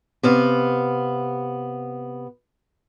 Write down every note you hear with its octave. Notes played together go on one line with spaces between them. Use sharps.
C3 B3 F5